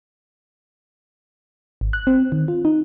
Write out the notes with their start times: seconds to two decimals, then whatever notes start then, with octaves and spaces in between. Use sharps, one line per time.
1.81 G#1
1.93 F#6
2.07 C4
2.32 D#3
2.48 F4
2.65 D#4